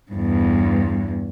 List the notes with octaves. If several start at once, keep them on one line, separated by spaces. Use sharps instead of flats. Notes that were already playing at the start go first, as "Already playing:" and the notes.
E2 G2